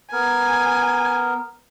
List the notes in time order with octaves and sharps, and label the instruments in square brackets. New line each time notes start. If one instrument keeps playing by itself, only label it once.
[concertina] B3 A#4 [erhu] G#5